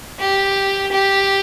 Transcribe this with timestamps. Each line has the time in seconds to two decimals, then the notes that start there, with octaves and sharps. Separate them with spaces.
0.19 G4
0.92 G4